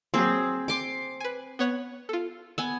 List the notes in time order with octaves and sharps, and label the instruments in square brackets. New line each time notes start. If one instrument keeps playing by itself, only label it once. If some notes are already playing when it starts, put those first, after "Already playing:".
[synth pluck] F#3 A#3 [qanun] C4 G#4
[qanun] C6 D6
[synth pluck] B4 G#5
B3 C#5 F#5
F4 A4
[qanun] B3 G#5 [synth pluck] E6